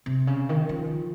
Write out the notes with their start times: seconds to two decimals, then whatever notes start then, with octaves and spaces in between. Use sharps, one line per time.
0.06 C3
0.27 C#3
0.49 D#3
0.69 F3